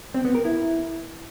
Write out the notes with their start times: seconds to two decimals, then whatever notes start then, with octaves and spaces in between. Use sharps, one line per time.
0.14 C4
0.25 B3
0.35 A#4
0.45 E4